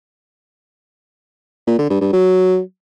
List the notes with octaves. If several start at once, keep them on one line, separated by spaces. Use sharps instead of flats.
A#2
D3
G2
G2
F#3